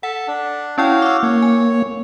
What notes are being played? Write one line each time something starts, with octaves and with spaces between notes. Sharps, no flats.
A4 F#5 A5
D4
C#4 E4 F#4 C#5 F5 G5
D6 E6
A#3 C#5
G#5